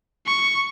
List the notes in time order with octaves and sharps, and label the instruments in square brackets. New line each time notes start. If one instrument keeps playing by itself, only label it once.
[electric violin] C#6